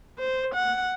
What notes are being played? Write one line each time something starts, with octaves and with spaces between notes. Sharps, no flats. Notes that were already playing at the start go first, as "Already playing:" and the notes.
C5
F#5